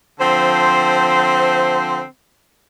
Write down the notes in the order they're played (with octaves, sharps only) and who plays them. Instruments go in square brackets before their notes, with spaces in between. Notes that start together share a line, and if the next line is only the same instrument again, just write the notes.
[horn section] D3 F3 C4 C5